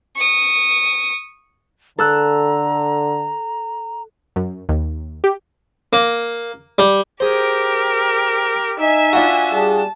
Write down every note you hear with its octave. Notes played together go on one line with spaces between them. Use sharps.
C#6 D#6
D3 A4 A#5 E6 F#6
F#2
D#2
G4
A#3
G3
G4 G#4 A#4 C5
D#4 E5 G#5 E6
D4 F4 F#4
G3 G#4 A5